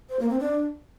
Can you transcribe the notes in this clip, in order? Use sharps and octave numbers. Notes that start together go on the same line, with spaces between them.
C5
A#3
C4
D4